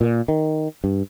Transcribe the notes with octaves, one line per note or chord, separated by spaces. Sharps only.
A#2
D#3
G2